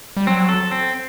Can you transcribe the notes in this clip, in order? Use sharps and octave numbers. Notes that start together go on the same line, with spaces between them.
G3
F#3 C4
A4
C4